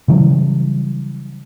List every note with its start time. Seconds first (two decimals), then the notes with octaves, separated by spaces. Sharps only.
0.08 C#3 E3 F#3 G3